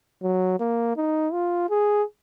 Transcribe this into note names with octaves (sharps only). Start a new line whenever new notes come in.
F#3
A#3
D#4
F4
G#4